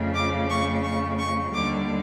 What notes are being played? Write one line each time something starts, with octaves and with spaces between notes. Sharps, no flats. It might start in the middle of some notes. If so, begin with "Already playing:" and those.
Already playing: F2 C#3 F3 A3
D6
C#6
C#6
C#6
D#2 D3 G3 D6